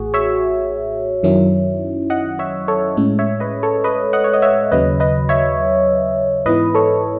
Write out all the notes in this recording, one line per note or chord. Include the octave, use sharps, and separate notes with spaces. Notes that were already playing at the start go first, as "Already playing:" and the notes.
Already playing: A1 A2 F#4 G#4
C#5 E5
F#2 D#3 F#3 C#4 E4
D#5 F#5
C#5 E5
A4 C#5
A2 G#3 C#4
C#5 E5
B4 D#5
A4 C#5
B4 D#5
D#5 F#5
C#5
D#5
C#5 E5
D#2 C#3 F#3 B4 D#5
B4 D#5
C#5 E5
G#2 E3 B3 E4 B4 D#5
A4 C#5